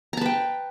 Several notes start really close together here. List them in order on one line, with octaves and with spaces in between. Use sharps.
A#5 A5 B4 G5